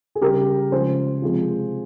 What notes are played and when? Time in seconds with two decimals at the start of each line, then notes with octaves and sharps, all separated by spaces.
0.15 G#4
0.21 C#3 G3 G4 A#4
0.72 C#3 F3 G#3 G#4 C5
1.22 C3 F3 G#3